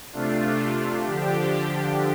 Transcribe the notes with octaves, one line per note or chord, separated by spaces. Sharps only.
C3 A3 D4 F4
D3 F3 D4 G4